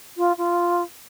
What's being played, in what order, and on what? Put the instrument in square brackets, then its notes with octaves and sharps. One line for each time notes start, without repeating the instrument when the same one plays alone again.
[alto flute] F4
F4